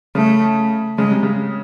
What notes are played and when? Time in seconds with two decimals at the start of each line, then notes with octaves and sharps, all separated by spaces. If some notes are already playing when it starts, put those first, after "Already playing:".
0.15 C#3 A3
0.98 C#3 G#3
1.11 C3
1.23 C#3